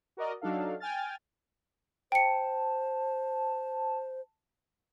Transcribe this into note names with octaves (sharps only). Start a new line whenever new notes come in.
F#4 A#4 D5 D#5
F#3 D4 D#4 A4 F5
G5 G#5 F6 A6
C5 G5 A5 C#7